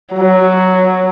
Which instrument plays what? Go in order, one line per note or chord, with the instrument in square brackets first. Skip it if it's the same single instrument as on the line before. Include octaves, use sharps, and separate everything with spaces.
[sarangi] F#3